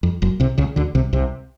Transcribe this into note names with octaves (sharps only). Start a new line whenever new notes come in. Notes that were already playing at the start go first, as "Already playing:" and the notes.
F2
F#1 F#2
C2 C3
C#2 C#3
D2 D3
C2 C3
C2 C3